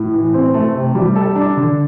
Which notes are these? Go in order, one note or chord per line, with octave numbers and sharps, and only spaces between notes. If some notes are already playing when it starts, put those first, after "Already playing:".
Already playing: A2
E3
C4
A3
C3
G3
A4
D4
D3